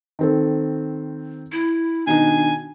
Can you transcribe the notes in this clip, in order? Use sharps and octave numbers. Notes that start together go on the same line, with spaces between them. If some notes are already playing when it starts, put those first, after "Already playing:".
D#3 C4 A4
E4
B2 D#3 D4 D#4 G#5